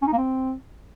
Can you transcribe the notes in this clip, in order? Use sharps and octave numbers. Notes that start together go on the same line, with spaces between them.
C#4
D#4
A#3
C4